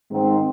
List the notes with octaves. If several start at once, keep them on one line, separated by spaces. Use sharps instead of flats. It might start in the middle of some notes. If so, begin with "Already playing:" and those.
G#2 D#3 G#3 C4